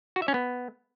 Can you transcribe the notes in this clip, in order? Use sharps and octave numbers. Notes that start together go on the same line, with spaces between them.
F#4
E5
C#4
B3